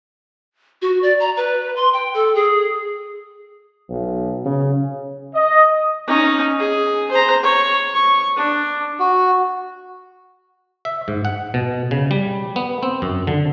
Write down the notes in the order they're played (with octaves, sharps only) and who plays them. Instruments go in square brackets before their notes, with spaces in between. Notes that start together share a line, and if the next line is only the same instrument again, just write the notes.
[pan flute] F#4
D5
A#5
B4
C6
G5
A4
G#4
[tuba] B1
C#3
[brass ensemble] D#5
[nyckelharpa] C#4 D#4
G#4
C5 A#5
C#5
C#6
D4
[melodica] F#4
[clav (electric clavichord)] E5
G#2
F#5
B2
C#3
G3
B3
C4
F#2
D3